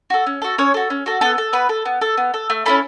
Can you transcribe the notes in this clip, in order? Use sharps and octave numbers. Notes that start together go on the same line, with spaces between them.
F#4 A4
C#4
F#4 A4
C#4 C#5
F#4 A4
C#4
F#4 A4
B3 A4
A4
B3 B4
A4
B3
A4
B3
A4
A3
C#4 E4 A4 B5